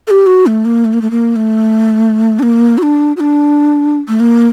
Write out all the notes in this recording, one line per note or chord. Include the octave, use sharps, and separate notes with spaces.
A4
G4
F#4
A3
A#3
A3
A#3
A3
A#3
A3
D4
A#3
F#4
D4
F#4
D4
A3
A#3